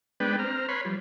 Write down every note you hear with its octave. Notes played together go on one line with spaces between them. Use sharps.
G#3 B3 D4 B4 G5
C4 A#5 F6
B4 C#5 B5 C6
F3 G3